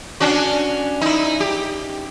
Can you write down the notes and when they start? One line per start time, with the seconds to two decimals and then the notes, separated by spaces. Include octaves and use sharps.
0.20 C#4 D4 F#4
1.01 D#4 E4
1.40 G4